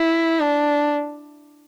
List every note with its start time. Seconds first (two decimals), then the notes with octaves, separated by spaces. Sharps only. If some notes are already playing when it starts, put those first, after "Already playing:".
Already playing: E4
0.40 D4